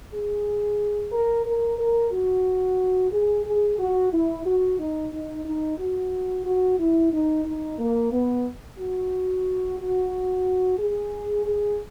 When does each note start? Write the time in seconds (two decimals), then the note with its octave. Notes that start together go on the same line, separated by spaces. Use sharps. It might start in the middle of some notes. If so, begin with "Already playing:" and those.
0.12 G#4
1.12 A#4
1.45 A#4
1.78 A#4
2.11 F#4
3.12 G#4
3.45 G#4
3.78 F#4
4.12 E4
4.46 F#4
4.79 D#4
5.12 D#4
5.45 D#4
5.78 F#4
6.45 F#4
6.79 E4
7.12 D#4
7.45 D#4
7.79 A#3
8.12 B3
8.78 F#4
9.78 F#4
10.78 G#4
11.46 G#4